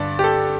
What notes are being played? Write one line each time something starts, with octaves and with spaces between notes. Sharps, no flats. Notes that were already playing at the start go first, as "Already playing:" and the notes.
Already playing: G2 D3 D5
G4
A4